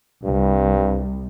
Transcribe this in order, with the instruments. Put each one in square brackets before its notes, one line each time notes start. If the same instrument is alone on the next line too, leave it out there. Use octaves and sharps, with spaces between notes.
[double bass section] C2 [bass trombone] G2